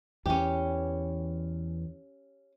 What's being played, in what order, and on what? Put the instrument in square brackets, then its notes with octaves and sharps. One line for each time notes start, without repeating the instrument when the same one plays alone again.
[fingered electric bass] E2 E3 [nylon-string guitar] C#4 G4